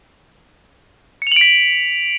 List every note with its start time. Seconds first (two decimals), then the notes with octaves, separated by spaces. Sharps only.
1.22 C#7
1.27 F7
1.32 F#7
1.36 D7
1.41 B6